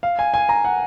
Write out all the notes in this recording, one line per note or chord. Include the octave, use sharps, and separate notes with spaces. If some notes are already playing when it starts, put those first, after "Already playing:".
F5
G#5
G#5
A#5
F#5